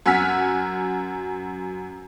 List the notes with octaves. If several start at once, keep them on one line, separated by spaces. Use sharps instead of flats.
F#2 F#5 G#5 E6 F6 B6